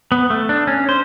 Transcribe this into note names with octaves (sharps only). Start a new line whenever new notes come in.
B3
A3
D4
C#4
C5